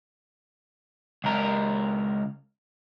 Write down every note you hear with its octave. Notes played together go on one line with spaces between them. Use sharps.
C#2 A#4